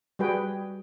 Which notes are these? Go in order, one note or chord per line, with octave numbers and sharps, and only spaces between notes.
G3 F#4 G#4 B4 G5